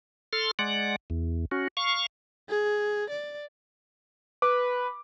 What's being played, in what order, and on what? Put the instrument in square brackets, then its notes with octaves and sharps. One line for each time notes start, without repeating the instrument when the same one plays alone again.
[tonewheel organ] A4 C6 F6
G#3 D5 F#5
E2
C#4 F#4
F5 C#6
[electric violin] G#4
D5
[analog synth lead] B4 [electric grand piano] D6